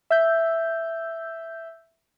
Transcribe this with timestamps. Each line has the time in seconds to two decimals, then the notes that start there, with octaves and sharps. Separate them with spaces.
0.10 E5 E6 G6